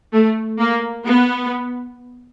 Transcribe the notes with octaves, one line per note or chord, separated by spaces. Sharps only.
A3
A#3
B3